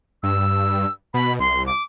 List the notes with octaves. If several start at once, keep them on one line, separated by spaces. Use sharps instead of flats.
G2 E6
B2 B5
C2 C6
D6